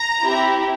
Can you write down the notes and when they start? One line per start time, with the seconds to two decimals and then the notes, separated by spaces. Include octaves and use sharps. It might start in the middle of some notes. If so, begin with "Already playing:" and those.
Already playing: A#5
0.21 C4 E4 G4